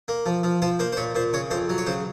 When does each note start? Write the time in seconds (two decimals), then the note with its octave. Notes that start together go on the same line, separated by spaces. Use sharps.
0.08 A#3
0.26 F3
0.43 F3
0.62 F3 C5
0.79 A#3 C5
0.92 C5
0.97 A#2 C#5
1.15 A#2 C5
1.33 C#3 C#5
1.51 F2 C5
1.69 F#3
1.78 C#5
1.86 C#3 C5